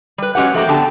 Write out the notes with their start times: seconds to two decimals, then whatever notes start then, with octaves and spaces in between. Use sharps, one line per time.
0.18 G3 B4
0.35 F#3 G#3 C#4 G4 B4 F#5
0.54 F3 A3 A#3 D#4 F#4 G4
0.68 D3 B3 G5 A5